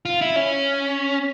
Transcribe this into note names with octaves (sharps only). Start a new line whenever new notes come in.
F4
E4
C#4